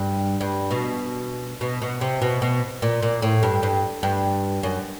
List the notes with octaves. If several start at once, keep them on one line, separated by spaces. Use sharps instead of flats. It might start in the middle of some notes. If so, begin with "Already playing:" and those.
Already playing: G2
G2
B2
B2
B2
C3
B2
B2
A#2
A#2
A2
G2
G2
G2
F#2